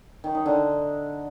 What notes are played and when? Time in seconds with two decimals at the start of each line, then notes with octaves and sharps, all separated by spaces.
0.24 D#3
0.35 D#4
0.46 D3